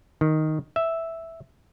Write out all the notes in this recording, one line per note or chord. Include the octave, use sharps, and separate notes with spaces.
D#3
E5